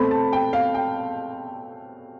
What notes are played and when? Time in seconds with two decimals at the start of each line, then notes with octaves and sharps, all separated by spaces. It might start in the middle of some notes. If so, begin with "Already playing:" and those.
Already playing: B2 A3 C4 B5
0.11 A5
0.33 G5
0.53 F5
0.75 G5